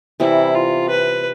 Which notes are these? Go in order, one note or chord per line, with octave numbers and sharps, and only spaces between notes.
C3 E3 G3 E4
F4
B4